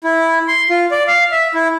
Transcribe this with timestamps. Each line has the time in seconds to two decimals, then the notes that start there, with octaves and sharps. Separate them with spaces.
0.04 E4
0.48 C6
0.70 F4
0.91 D5
1.07 F5
1.32 E5
1.54 E4